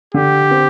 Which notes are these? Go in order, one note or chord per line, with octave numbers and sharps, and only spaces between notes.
D3 G4
C4